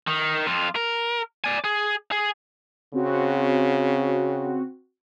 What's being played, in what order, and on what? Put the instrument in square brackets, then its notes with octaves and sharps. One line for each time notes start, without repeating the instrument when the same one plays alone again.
[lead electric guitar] D#3
F2 F4
A#4
D5 G#5
G#4
G#4
[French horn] C#3 [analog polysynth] C4 F#4